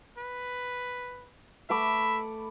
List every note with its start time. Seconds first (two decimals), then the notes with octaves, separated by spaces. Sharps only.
0.18 B4
1.70 A3 E5 B5 D6